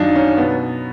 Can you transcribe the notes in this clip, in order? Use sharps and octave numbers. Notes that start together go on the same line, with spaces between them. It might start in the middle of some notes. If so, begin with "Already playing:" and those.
Already playing: F#2 D#3 F#3 D4 D#4 F4
C#4
B2 F#3 B3